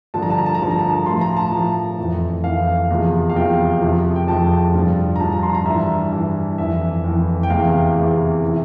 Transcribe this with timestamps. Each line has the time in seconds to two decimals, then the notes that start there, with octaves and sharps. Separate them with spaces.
0.14 G2 D3 F3 A5
0.22 A#5
0.30 A5
0.38 A#5
0.46 A5
0.55 A#5
0.60 G2 D3 F3 A5
0.71 A#5
0.79 A5
1.06 A2 F3 C6
1.21 A#5
1.37 A5
1.52 A2 F3
1.98 F2 E3
2.44 F2 E3 F5
2.90 E2 C3 F3
3.29 F5
3.36 E2 C3 F3 G5
3.82 F2 C3 F3
4.16 G5
4.27 F2 C3 F3 A5
4.74 G2 F3
5.16 A#5
5.20 G2 F3 A5
5.32 A#5
5.43 C6
5.55 A#5
5.66 G2 E3 E5
6.12 G2 E3
6.58 F2 E3 E5
7.04 F2 E3
7.43 G5
7.50 E2 C3 E3 F5
7.96 E2 C3 E3
8.46 E3